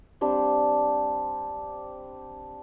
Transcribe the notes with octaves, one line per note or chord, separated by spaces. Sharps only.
G3 C4 D4 G4